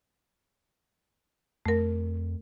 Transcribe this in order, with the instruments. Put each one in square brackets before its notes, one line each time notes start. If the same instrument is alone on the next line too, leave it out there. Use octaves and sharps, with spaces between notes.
[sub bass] F2 [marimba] A3 A#4